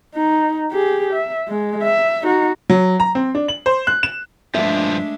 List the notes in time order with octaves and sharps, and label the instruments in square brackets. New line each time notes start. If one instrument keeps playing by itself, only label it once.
[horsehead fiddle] D#4
G4 G#4
E5
G#3
E5
D#4 F#4
[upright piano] F#3
A#5
C4
D4
F#7
C5
F#6
E7
[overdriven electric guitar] G2 F3 [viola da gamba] G#3 A3 D4 [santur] E5 D6